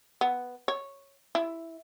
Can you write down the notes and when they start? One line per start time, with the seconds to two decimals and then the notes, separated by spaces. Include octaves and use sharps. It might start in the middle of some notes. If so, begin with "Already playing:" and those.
0.21 B3
0.68 C#5
1.35 E4